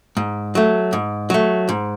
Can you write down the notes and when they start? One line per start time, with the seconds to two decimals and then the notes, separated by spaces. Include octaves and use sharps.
0.17 G#2
0.55 F#3 A3
0.93 G#2
1.30 F#3 A3
1.69 G#2